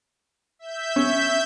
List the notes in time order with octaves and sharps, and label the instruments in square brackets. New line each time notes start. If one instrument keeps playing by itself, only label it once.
[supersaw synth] E5 G6
[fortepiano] C#4